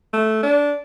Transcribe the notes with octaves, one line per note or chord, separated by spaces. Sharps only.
A3
D4